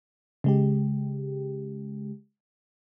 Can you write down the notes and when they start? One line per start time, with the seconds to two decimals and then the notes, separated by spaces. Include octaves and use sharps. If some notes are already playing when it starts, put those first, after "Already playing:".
0.44 C#3 G#3 G4